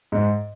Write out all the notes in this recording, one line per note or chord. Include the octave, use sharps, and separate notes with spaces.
G#2